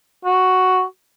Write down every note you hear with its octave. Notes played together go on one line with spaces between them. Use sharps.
F#4